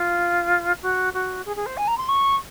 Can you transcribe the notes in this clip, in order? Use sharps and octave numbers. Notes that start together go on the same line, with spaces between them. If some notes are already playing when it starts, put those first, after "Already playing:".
Already playing: F4
F#4
F#4
G#4
G#4
C5
G#5
A#5
C6
C#6